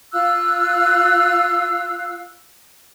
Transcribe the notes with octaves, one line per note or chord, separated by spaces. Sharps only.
F4 F5 E6 F#6